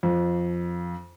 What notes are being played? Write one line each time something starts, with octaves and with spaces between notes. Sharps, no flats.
F2